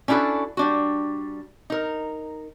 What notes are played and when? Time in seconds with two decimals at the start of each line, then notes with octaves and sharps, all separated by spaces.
0.08 C#4 D4 E4 F#4 A4
0.57 G3 D4 F#4
1.70 D#4 A#4